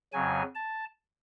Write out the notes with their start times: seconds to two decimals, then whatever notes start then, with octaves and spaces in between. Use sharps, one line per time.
0.12 F2 C#3 F#3 G#5
0.55 A5